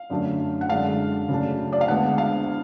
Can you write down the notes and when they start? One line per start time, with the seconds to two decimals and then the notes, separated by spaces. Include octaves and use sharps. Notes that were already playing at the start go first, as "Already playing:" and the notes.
Already playing: F5
0.10 F#2 D3 F#3 A3 D4
0.61 F#5
0.69 F#2 D3 G#3 D4 F5
1.29 C#3 F#3 A3 D4
1.73 D5
1.81 F5
1.88 D2 D3 G#3 B3 D4 F#5
2.18 F5